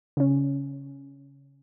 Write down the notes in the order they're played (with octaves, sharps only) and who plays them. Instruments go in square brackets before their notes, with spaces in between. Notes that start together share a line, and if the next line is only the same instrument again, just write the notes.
[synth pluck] C#3 C#4